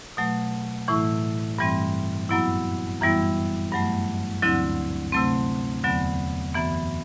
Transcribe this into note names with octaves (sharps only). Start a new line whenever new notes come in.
B2 F#3 A3
A2 E3 A3 E4
G2 E3 G3 C4
F#2 F#3 B3 E4
F#2 E3 G3 B3 E4
G2 F#3 A3
D2 D3 F#3 C4 E4
C3 F#3 A3 C4
E2 D3 F#3 B3
F#2 E3 B3